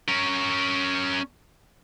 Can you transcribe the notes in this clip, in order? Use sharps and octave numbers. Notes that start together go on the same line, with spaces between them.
C#4 A#4